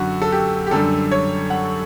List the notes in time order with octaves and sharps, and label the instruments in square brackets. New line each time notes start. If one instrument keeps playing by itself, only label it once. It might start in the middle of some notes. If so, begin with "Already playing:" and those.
Already playing: [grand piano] F#2 D3 F#4
A4
G4
G4
F#2 D3 G3 A4
C#5
F#5